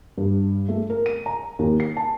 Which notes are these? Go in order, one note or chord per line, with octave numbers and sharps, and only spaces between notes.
G2
A3
A#4
D#7
A#5
D#2
C7
A5